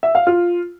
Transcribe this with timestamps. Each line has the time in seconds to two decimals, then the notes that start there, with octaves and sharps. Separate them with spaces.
0.03 E5
0.15 F5
0.27 F4